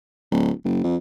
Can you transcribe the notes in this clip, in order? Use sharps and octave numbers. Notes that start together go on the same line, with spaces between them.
D1
F#1
F2